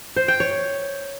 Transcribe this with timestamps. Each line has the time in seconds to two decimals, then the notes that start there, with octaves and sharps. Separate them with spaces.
0.16 C5
0.28 G5
0.40 C#5